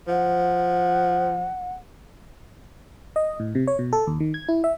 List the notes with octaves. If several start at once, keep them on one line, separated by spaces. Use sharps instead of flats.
F3 F#5
D#5
A2
C3
C#5
B2
A4
D#2
D#3
G#6
E4
E5